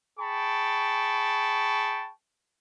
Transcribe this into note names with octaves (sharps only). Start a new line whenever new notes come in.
G#4 G5 A5 B5 C#6